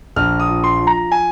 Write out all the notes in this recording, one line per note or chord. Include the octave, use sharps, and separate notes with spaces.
A#1 F6
D#6
F3
C6
F3
A#5
G#5